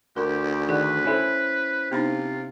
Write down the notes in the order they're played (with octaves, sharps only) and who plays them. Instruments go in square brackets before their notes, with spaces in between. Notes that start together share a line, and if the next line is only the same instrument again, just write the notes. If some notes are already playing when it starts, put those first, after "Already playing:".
[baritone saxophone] D2 [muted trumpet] G4 [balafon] A#4
[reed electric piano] D#3 [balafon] G#4 D5 F#5 [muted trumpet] B4
[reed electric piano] C#4 E4 C5 [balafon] A4 G#5
[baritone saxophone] C3 [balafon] B3 D4 D#4 [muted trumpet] F4